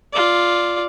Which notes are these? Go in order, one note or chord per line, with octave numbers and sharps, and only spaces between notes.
F4 D5